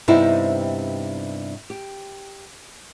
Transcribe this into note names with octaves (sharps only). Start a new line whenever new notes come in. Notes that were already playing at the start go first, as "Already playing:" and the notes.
G2 C3 B3 C4 D#4 E4
G4